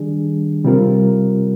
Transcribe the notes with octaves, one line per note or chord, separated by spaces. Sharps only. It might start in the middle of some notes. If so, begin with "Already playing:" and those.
Already playing: D#3 G3 D4 G#4
C3 G3 C4 F4 A#4